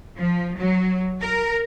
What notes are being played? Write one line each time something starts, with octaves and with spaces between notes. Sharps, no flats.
F3
F#3
A#4